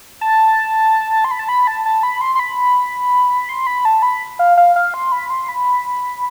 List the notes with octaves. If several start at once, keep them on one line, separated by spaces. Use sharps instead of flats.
A5
C6
B5
A5
B5
A5
A5
B5
C6
C6
B5
C6
B5
A5
B5
F5
F5
F5
C6
B5
C6
B5